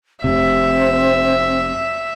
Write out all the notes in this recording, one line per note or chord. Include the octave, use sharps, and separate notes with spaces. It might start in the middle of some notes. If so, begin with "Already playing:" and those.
F1 C3 C4 E5